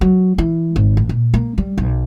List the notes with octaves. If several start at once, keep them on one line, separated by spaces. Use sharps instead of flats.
F#3
E3
G#1
A1
A#2
A#3
G3
B1